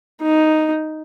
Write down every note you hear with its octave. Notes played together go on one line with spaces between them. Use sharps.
D#4